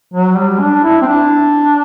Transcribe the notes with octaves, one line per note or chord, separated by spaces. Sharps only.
F#3
G3
D4
E4
C4
D4